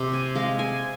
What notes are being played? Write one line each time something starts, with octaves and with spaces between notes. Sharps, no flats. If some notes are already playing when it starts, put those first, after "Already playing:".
Already playing: C3
G#5
G#3 F5
G#5